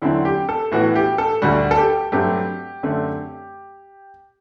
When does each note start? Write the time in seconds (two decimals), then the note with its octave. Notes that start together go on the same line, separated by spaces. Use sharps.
0.02 E2 D3 F#3 C4 E4
0.25 G4
0.49 A4
0.72 A2 E3 B3 F#4
0.95 G4
1.18 A4
1.42 D2 D3 G3 F#4
1.71 A4
1.78 G4
2.12 G2 F#3 A3 C4 G4
2.83 F#2 D3 A3 C4